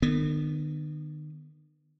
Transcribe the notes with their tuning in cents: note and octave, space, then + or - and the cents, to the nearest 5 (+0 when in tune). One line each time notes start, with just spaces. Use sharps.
D#3 -45 B3 +0